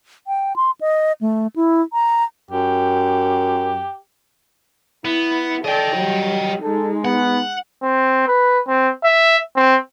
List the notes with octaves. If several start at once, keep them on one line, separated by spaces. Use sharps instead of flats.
G5
C6
D#5
A3
E4
A#5
F#2 G4
B3 E4
A4 D5 D#5 G5
F#3 G3
G#3 D#4 A4
B3 F#5
C4
B4
C4
E5
C4